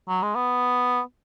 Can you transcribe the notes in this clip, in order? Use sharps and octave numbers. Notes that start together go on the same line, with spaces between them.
F#3
G#3
B3